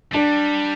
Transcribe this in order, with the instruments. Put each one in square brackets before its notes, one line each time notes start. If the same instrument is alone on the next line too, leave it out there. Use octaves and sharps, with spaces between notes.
[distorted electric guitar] G3 [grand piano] D4